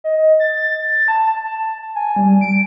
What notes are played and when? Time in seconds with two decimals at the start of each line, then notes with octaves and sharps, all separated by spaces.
0.04 D#5
0.40 A6
1.08 A5
1.95 G#5
2.16 G3
2.41 D7